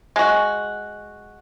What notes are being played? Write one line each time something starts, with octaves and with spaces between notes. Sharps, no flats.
G#3 F#4